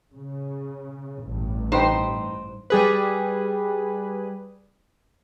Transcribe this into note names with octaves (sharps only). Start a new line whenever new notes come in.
C#3
A1 G2
D#4 B4 C5 G5
G3 G#4 B4